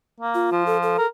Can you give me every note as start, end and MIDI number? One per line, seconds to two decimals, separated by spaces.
0.21 0.51 58
0.35 0.63 65
0.51 0.95 53
0.66 0.77 69
0.83 1.05 69
0.98 1.07 70